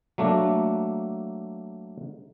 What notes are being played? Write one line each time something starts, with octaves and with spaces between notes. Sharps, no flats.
F#3 A3 A#3 D4